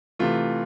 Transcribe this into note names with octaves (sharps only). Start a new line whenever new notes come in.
C3 E3 A3 F4